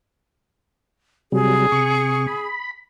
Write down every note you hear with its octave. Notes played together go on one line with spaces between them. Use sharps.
C3 F#3 G3 G#4
C3 C#6
B5